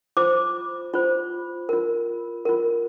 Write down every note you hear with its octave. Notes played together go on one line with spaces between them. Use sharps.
F4 C5 D6
F4 C5
F4 A#4
F4 A#4